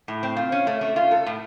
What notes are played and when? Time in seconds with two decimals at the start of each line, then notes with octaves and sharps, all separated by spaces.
0.08 A2
0.23 C4
0.37 F4
0.52 C#4
0.67 A3
0.81 A3
0.96 F4
1.11 A4
1.26 A2